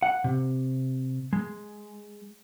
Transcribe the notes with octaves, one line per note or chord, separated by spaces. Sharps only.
F#5
C3
G#3